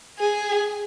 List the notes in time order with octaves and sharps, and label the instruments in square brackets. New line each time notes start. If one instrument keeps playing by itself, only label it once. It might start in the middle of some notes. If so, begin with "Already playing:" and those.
[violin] G#4